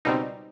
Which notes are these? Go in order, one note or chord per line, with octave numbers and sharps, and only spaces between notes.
C#2 B2 G3 C4 D#4